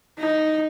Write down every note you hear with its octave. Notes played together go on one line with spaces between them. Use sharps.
D#4